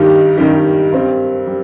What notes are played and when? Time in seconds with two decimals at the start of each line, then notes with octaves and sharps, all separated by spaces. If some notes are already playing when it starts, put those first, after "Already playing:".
Already playing: G2 D#3 G3 D#4 G4
0.38 G2 D#3 G3 D#4 G4
0.92 G2 G3 C4
1.47 G3